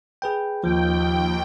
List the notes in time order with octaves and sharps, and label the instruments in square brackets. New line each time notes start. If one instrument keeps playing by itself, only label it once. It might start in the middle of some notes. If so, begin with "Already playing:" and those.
[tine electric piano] G#4 B4 G5
[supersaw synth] D#2 G5 [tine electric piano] F3